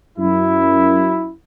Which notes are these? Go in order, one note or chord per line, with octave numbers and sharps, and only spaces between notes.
F#2 E4